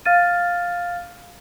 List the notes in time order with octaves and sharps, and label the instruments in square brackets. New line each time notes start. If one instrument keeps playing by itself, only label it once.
[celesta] F5 F6 A6 D#7